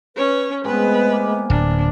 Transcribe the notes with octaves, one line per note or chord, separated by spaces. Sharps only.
C#4 B4 C#5
A2 G#3 B3 C4 G#4 B4
A#3
D1 A#3 D4